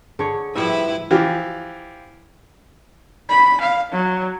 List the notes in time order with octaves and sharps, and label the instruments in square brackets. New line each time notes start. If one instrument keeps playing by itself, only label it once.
[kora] D3 C#5 [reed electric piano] G#4
[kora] A2 G3 E5 [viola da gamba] F3 E4 B4
[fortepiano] E3 F3 F4 G4
[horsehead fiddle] B5
F5
F#3